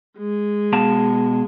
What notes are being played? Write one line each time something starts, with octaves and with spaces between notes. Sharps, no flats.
G#3
B2 F5 A5